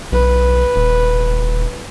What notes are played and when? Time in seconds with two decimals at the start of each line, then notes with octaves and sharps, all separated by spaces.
0.12 B1 B4
0.76 D#1